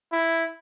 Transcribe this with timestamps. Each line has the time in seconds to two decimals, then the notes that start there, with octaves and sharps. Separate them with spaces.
0.12 E4